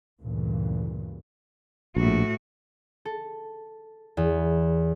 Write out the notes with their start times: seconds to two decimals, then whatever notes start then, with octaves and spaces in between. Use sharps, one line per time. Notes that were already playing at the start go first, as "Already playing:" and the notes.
0.22 D2 G2 A#2 C#3 E3
1.96 A#1 A2 F#4
3.05 A4
4.17 E2